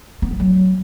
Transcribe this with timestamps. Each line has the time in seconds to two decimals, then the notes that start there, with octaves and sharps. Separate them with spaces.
0.22 B3
0.31 F3
0.40 F#3